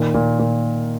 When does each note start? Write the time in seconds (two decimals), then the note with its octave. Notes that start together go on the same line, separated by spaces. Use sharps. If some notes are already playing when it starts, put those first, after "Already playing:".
Already playing: A#2 D#3
0.14 A#2
0.39 A#2